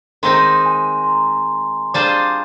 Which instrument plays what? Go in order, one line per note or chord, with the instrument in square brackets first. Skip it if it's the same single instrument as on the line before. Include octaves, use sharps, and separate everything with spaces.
[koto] D#3 G#3 C4 D#4 [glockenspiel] C6
[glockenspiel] G#5
C6
A#5
[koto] G3 D4 F4 G#4 C5 [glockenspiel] D6